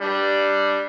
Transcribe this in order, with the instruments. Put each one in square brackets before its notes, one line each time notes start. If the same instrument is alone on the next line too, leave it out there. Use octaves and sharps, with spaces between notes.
[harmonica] G3 D4